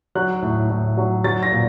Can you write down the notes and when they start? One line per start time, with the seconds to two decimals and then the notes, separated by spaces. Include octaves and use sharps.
0.15 F#3 F#6
0.42 A2
0.70 A2
0.97 F#3
1.24 F#3 A6
1.43 A#6
1.52 A#2